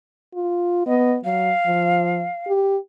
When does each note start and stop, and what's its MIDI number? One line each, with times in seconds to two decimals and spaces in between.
0.34 0.85 65
0.86 1.18 59
0.86 1.14 75
1.25 1.52 54
1.25 2.50 77
1.66 2.27 53
2.48 2.77 67